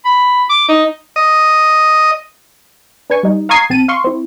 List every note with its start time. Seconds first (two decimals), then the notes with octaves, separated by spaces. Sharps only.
0.05 B5
0.50 D6
0.69 D#4
1.16 D#5
3.10 D4 B4 G#5 C#6
3.23 G3 D#4
3.49 F5 A#5 C#6 D#6 G#6 C7
3.70 B1 C4 A5 D#7
3.88 F5 C6 C#6
4.04 C4 E4